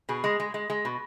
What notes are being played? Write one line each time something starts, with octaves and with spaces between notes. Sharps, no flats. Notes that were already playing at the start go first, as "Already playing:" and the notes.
B2 G#4
G#3
G#3
G#3
G#3
B2